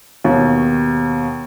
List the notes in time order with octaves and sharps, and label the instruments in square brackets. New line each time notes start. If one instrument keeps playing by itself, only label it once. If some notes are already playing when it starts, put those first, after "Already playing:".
[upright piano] D#2 B2